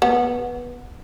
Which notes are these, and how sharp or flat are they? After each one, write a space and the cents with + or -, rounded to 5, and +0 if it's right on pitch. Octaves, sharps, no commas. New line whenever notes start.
B3 -15